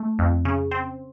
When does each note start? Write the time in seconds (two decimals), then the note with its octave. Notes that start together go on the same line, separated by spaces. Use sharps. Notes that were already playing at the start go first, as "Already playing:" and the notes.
Already playing: A3
0.19 F2
0.45 C#3
0.71 C4